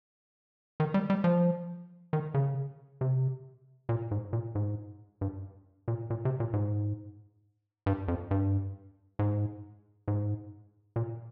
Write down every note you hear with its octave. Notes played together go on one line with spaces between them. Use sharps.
D#3
G3
G3
F3
D#3
C#3
C3
A#2
G#2
A#2
G#2
G2
A#2
A#2
C3
A#2
G#2
G2
F2
G2
G#2
G#2
A#2